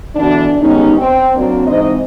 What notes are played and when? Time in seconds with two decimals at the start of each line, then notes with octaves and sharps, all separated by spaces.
0.16 B2 D3 E3 D4
0.60 G2 D#3 G#3 B3 C#4 D#4
0.97 C4
1.35 F#3 A#3 C4 D4
1.66 G#2 E3 C4 C5 D#5